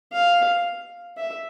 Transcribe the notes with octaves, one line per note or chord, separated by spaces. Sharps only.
F5
E5